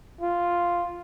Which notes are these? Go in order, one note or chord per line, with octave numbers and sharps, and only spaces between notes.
F4